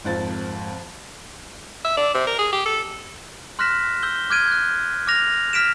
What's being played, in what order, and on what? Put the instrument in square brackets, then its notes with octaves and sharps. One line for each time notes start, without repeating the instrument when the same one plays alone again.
[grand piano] G#1 F2 A6
[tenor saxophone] E5
D4
C3
A#4
G#4
G4
A4
[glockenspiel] C6 F6 F#6 A#6 B6 E7
E6 G6 G7
D6 F6 F#6 G#6 D7 D#7
F#6 G6
D6 F6 F#6 A#6 F7
F6 B6 D7 E7